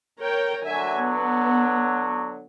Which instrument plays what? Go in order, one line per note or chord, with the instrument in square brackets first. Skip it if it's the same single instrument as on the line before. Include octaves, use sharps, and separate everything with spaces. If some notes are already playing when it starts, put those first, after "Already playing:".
[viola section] A#4 C#5 G5
[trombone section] D3 F#3 [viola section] E5 G#5
[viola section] B3